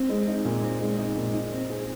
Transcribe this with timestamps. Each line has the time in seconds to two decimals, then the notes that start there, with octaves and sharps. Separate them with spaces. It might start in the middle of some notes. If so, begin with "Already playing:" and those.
Already playing: C4
0.09 G#3
0.27 D#4
0.45 A#2
0.62 C4
0.80 G#3
0.98 D#4
1.16 A#2
1.33 D#4
1.52 C4
1.70 G#4